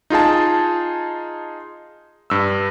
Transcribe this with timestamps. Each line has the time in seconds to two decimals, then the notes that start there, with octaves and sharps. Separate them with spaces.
0.10 D#4 F4 G#4 A5
2.30 G2 E6